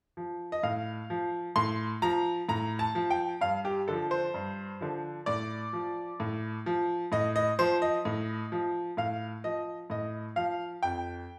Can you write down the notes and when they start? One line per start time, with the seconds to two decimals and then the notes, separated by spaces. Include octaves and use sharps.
0.17 F3
0.52 D#5
0.63 A2 F5
1.10 F3
1.56 A2 C6
2.02 F3 A#5
2.49 A2 A#5
2.79 A5
2.95 F3
3.10 G5
3.41 G2 F5
3.65 G4
3.88 D3 F3 A4
4.11 C5
4.34 G2
4.81 D3 F3
5.26 A2 D5
5.73 F3
6.20 A2
6.66 F3
7.12 A2 D#5
7.36 D#5
7.59 F3 C5
7.82 D#5
8.05 A2
8.52 F3
8.97 A2 F5
9.44 F3 D#5
9.90 A2 D#5
10.36 F3 F5
10.83 F2 G5